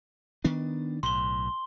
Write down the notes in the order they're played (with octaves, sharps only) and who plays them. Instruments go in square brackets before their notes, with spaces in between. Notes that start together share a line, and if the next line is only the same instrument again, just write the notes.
[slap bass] D#3 B3 D4
[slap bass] B1 A2 [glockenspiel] C6 G7